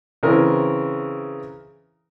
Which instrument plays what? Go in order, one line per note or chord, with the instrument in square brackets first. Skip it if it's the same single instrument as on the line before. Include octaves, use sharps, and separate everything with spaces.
[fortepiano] C#3 E3 C4 A#4